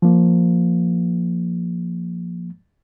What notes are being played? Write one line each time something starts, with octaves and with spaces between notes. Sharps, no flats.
F3 A#3